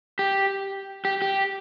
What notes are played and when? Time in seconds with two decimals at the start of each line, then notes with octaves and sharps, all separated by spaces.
0.19 G4
1.05 G4
1.22 G4